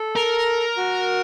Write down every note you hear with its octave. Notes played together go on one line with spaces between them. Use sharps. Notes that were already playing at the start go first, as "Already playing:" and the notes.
Already playing: A4
A#4
F#4